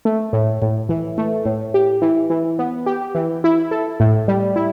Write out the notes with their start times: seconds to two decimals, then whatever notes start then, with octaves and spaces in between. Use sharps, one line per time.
0.05 A3
0.33 A2
0.62 A2
0.89 E3
1.18 A3
1.45 A2
1.74 G4
2.02 E3
2.30 E3
2.59 B3
2.86 G4
3.15 E3
3.44 E4
3.71 A4
4.00 A2
4.28 G3
4.56 E4